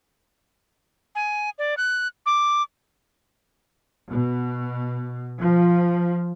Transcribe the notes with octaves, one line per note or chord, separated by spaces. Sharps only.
G#5
D5
F#6
D6
B2
F3